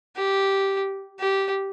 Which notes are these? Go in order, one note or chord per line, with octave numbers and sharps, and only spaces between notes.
G4
G4